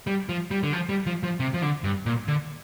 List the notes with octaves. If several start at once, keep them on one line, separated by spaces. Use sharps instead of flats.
G3
F3
G3
D3
F3
G3
F3
F3
C3
F3
D3
G2
A#2
D3